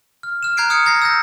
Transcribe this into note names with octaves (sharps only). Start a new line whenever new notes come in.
F6
F6 E7
A#5 F#6 G#6 C7 D7
D#6 F6 G#6 C#7
A#5 G#6 A#6 C7
E6 G6 A#6